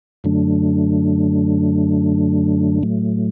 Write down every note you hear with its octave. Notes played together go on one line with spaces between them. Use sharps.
F#2 D3 F#3 A3 D4
A2 F#3 A3